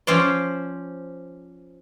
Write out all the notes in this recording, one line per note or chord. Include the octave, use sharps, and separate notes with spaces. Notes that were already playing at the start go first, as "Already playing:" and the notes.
F3 C#4 C5 D5